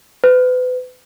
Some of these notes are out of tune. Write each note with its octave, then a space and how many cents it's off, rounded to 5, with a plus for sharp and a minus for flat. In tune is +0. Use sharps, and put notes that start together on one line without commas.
B4 +35